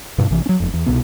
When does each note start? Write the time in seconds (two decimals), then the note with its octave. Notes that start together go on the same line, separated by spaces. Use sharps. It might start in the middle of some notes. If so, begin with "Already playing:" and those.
0.18 G2 B2
0.30 A#1 C3 E3
0.46 F#3 C#4
0.60 F#1 F2
0.74 E2
0.86 C2 B2 B3